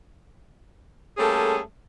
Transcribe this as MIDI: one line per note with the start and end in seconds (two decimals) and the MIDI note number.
1.18 1.59 55
1.18 1.59 57
1.18 1.59 58
1.18 1.59 61
1.18 1.59 68
1.18 1.59 69